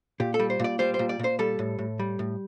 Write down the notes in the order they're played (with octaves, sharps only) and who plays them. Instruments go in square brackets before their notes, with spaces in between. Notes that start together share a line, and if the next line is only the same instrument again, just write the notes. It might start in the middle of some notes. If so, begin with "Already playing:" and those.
[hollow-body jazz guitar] A#2 G4
A4
G3
C5
A#2 D5
G3 C5
C5
A#2
D5
A#2 C5
G3 A4
A2
A2
G3
A2